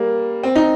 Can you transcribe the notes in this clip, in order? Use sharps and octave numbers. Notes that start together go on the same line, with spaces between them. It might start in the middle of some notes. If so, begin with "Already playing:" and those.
Already playing: G3 A#3
C4
D#4